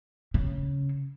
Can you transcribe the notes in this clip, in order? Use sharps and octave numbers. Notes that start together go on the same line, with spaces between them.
C#3